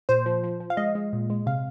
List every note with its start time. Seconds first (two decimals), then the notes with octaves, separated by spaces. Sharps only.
0.09 A#2 C5
0.26 F3
0.43 F3
0.60 F3
0.70 F5
0.77 G#3 D#5
0.95 G#3
1.13 A#2
1.30 G#3
1.46 C3 F5